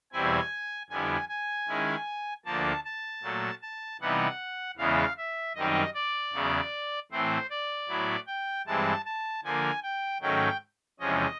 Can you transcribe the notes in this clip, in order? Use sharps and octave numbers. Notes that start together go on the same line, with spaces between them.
E2 B2 G3 C4 E4 G#5
F2 D3 G3 B3 E4 G#5
G#5
D#3 G#3 C#4 E4
D2 D3 F3 A#3 A5
A5
A#2 F#3 A3
A5
C3 E3 G3 B3 D#4 F#5
E2 C#3 E3 G#3 B3 F5
E5
F#2 D#3 G3 C4 D#4 D#5
D5
E2 C#3 F#3 B3
A2 E3 A3 C4 C5
D5
A2 F#3 B3 E4
G5
G2 E3 G#3 C4 A5
A5
D3 F3 A#3 G#5
G5
G#2 D#3 F#3 A3 C#4 G5
E2 C3 F3 G#3 C#4 D#5